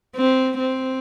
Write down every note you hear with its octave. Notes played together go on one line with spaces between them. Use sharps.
C4
C4